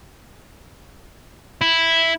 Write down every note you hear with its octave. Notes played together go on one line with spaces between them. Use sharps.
E4